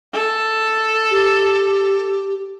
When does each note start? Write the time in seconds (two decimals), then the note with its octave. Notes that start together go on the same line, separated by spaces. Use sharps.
0.14 A4
1.11 G4